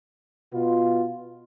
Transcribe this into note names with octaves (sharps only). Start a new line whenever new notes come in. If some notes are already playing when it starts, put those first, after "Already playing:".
B2 B3 F4